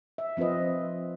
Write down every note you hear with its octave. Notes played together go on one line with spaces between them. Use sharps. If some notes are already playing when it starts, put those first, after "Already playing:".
E5
F3 C4 F4 B4 D#5